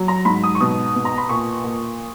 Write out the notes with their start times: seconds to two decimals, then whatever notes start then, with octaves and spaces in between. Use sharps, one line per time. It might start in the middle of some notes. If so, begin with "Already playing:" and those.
Already playing: F#3
0.08 A#5
0.25 G#2 B5
0.43 D#6
0.55 C#6
0.60 B2 D#6
0.95 B2
1.05 A#5
1.18 B5
1.29 A#2 C#6
1.64 A#2